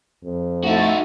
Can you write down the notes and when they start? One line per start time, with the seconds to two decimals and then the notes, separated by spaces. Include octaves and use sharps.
0.24 F2
0.64 A3 D#4 E4 F#4 A6